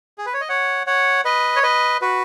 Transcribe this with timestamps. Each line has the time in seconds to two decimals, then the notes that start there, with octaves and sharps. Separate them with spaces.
0.18 G#4
0.26 B4
0.34 C#5
0.41 D#5
0.49 C#5 F#5
0.87 C#5 F#5
1.25 B4 D#5
1.56 C#5
1.63 B4 D#5
2.02 F#4 B4